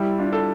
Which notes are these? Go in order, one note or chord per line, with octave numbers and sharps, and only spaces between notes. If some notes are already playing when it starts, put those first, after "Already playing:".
Already playing: G3 E4 G4
D4 F4
A4